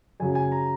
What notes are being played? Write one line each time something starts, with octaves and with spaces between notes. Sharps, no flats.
F#2 C#3 F#3 G#5
G#5
A#5